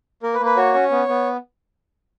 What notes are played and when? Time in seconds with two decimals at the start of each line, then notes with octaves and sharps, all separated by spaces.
0.23 A#3 A#4
0.34 B4
0.40 A#3
0.45 B4
0.57 F#4 C#5
0.74 C#4
0.91 B3
1.08 B3